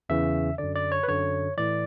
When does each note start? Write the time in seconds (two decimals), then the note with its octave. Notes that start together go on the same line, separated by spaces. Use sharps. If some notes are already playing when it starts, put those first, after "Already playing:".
0.09 E2 C#3 E3 E5
0.58 F#2 D3 D5
0.75 D5
0.92 C#5
1.03 B4
1.08 F#2 D3 C#5
1.57 A2 E3 D5